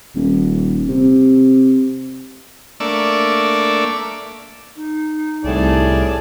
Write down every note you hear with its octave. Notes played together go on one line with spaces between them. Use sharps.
D#1
C3
A3 A#3 D4 D5 E5 C#6
D#4
C2 A2 G#4 D5 A5